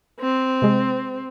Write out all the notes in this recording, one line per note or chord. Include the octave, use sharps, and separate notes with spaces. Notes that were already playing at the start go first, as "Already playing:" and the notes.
C4
C3 G#3